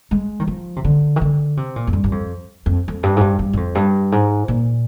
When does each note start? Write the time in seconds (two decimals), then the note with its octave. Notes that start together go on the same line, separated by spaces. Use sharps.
0.11 G#3
0.40 D#3
0.47 F3
0.76 C3
0.84 D3
1.16 D#3
1.21 D3
1.57 C3
1.76 A#2
1.87 F2
1.93 G2
2.04 G2
2.12 F2
2.66 F2
2.88 F2
3.03 G2
3.17 G#2
3.21 G2
3.39 G2
3.53 G2
3.57 F2
3.75 G2
4.12 G#2
4.48 A#2